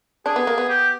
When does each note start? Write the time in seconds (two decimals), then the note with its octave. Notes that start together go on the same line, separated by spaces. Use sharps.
0.26 D4 G#4
0.36 B3
0.47 A#3
0.58 B3
0.69 G4